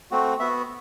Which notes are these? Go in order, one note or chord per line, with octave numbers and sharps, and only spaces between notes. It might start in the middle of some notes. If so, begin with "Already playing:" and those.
A3 C4 F#4
B3 F#4 E5